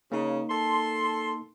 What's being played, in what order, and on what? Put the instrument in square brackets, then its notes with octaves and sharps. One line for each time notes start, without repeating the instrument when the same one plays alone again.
[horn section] C#3 [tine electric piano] A#3 D#4
[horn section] A4 C6